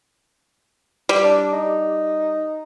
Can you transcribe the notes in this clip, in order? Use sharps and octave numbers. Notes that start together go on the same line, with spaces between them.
G3
D4
D#4